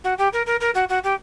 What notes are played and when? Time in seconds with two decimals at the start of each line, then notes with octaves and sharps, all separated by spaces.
0.04 F#4
0.18 G4
0.33 A#4
0.46 A#4
0.60 A#4
0.74 F#4
0.89 F#4
1.03 G4